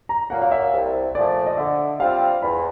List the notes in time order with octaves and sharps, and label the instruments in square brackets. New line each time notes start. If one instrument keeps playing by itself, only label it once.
[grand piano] A#5
[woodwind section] A#2 F#3 A#3 [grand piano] F#5
[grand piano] F5
E5
[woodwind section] C2
[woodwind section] A#2 F3 A3 [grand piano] D5
[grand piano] D#5
[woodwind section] D3 [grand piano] E5
[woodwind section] G3 C4 F4 [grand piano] F5
[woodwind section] E2 [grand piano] B5